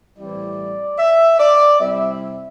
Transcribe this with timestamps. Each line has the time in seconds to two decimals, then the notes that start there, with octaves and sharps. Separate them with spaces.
0.18 A2 E3 G3 C4 E4 D5
0.99 E5
1.40 D5
1.80 C3 G3 C4 E4 E5